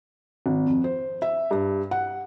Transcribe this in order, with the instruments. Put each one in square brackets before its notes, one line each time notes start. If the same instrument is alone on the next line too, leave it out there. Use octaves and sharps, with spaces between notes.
[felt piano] G#1
F2
C5
E5
G2
F#5